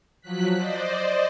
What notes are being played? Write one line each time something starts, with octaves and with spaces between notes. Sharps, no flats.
F3 F#3 F#6 B6
C5 D5 D#5